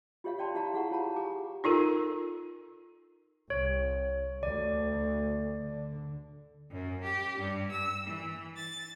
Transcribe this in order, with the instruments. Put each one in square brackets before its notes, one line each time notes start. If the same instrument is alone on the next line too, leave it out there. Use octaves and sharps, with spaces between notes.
[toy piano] F4 G4 C#5 E5 F5
C#5 D5 G5 A5 C6
E4 G4 E5 F5 A5 A#5
E4 G#4 F5 F#5 C#6
F4 C#5 A5 A#5
G4 G#5 D6
[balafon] D#4 F4 A4 A#4
[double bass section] C2 [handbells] C#5
[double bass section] D2 [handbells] D5
[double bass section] D3
[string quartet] F#2
G4
G2
E6
E3
A6